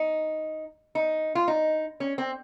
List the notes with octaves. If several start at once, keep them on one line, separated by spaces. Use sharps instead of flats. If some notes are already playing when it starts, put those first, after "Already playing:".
Already playing: D#4
D#4
F4
D#4
C#4
C4